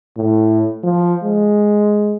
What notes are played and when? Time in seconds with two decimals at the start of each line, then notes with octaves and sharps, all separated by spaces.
0.17 A2
0.83 F3
1.23 G#3